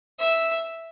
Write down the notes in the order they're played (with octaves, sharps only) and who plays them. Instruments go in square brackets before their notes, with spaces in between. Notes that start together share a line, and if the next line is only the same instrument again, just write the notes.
[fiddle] E5